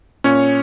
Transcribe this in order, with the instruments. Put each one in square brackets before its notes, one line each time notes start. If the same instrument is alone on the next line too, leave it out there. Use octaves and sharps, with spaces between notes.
[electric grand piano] A#2 C#4 C#5